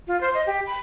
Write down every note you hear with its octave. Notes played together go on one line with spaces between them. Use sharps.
F4
C5
D#5
G4
B5